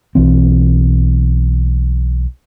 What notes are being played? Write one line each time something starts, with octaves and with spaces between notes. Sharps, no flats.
B1 E3 C4